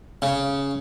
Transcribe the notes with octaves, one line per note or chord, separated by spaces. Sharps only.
C#3